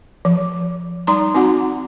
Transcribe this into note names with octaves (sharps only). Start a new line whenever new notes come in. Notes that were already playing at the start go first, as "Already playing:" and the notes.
F3
G3 D#4 A#5 C6
C4 D#4 F#4 F#5